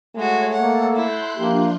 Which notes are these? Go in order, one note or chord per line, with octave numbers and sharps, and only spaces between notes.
G#3 A3 F#4 C#5
A#3 A4 F#5
E4 C6 F#6 G6
F3 A#3 D4 F4 G4